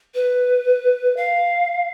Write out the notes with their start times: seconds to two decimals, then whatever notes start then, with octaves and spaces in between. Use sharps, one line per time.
0.15 B4
1.17 F5